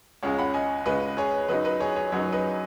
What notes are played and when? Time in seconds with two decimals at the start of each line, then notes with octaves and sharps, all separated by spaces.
0.23 C#2 C#3 G#3 C#5 F#5
0.39 F#5 B5
0.54 D#5 G#5
0.86 C#2 C#3 G#3 B4 D#5
1.17 G#4 C#5
1.48 F#2 F#3 D#4 B4 D#5
1.65 B4 D#5
1.80 G#4 C#5
1.96 G#4 C#5
2.12 F#2 F#3 D#4 G#4 C#5
2.32 B4 D#5